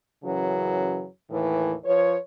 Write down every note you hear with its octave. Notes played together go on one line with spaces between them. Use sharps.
F#2 C#3 E3 F#3
D#2 A2 E3
F3 B4 C#5